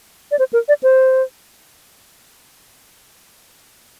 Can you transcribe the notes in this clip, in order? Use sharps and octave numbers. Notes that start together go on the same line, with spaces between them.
D5
C5
A#4
D5
C5